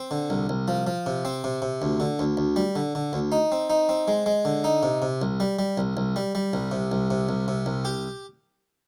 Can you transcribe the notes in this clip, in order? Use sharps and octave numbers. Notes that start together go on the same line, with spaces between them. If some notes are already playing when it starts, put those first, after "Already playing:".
Already playing: C4
D3
C2
C2
F3
F3
C3
C4
C3
C3
D2
D3
D2
D2
G3
D3
D3
D2
D#4
C4
D#4
C4
G#3
G#3
D3
D#4
C3
C3
C2
G3
G3
C2
C2
G3
G3
C2
C3
C2
C3
C2
C3
C2
G4